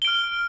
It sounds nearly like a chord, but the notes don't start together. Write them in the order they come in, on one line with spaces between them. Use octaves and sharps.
G7 D7 F6